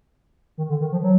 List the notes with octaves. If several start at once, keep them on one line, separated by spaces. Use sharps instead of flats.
D#3
D3
D#3
F3
F#3